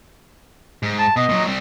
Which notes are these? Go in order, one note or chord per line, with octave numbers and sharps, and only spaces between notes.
G#2
A5
B2 B3 D#5
A#2 F#3
G3 C4